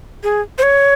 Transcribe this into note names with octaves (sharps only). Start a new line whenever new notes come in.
G#4
C5
C#5